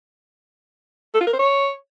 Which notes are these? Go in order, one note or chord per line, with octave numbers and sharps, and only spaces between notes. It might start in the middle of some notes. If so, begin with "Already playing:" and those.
A4
F4
A#4
C5
C#5